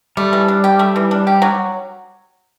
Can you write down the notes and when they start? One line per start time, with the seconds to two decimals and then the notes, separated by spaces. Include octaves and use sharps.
0.17 G3 A3
0.33 E3
0.48 D4
0.64 G4
0.79 A3
0.96 E3
1.11 D4
1.27 G4
1.42 F#3